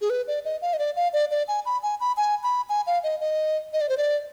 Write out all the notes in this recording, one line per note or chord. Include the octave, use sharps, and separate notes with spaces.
G#4
B4
D5
D#5
F5
D#5
D5
F5
D5
D5
G#5
B5
G#5
B5
G#5
B5
G#5
F5
D#5
D#5
D#5
D5
C5
D5